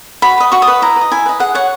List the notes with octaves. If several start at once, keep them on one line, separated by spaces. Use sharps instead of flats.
F#4 B5
B4 D#5
F#4 C#6
D#6
B4 D#5
E4 A#5
B4
D#5
E4 G#5
B4 D#5
G#4 F#5
C#5 F#5